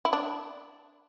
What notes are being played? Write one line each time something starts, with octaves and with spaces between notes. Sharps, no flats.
E4
D4